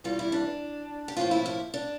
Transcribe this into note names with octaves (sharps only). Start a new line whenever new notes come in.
E2 E3 G3 F4
E4
D4
G4
A2 F3 A#3 F4
E4
E4
D4